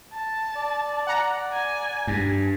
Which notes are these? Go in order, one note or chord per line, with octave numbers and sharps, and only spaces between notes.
A5
D5
F#5 A#5
G#5
G2